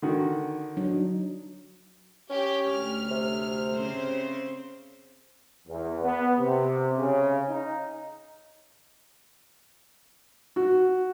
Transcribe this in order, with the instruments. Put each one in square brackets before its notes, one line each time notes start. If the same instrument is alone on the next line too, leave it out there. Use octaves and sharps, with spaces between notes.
[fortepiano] D3 D#3 F#4
[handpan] F#3 D4 D#4
[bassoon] C#4 [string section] G4
[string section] D2 F6
[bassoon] C3
[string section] C#3 C4 C5
[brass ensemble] E2
B3
C3
C#3
D#4
[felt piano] F#4